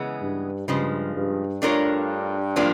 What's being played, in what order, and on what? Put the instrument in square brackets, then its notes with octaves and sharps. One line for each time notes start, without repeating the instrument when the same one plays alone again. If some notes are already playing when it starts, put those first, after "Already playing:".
Already playing: [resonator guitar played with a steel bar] C#3 E3 G#3 B3
[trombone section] G2
[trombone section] G2 [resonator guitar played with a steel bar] C#3 F3 G#3
[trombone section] G2
[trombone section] G2 [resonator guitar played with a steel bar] A3 D4 F4 A#4 C#5
[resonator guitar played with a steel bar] A2 F3 A#3 D4 F4